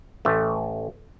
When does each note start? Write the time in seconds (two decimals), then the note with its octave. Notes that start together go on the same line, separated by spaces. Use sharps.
0.25 A1 A3